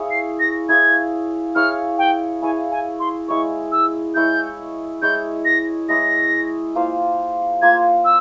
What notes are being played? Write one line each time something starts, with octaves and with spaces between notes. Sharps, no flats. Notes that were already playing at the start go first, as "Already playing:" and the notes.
Already playing: E4 G#4 C#5 F5
C7
A#6
E4 G#4 C#5 F5 G#6
E4 G#4 C#5 F5 F6
G5
E4 G#4 C#5 F5 G#5
G#5
C6
G#3 E4 G#4 C#5 C#6
E6
G#3 E4 G#4 C#5 G6
G#3 E4 G#4 C#5 G6
A#6
G#3 E4 G#4 C#5 A#6
A#3 F4 C5 F5
A#3 F4 C5 F5 G#6
E6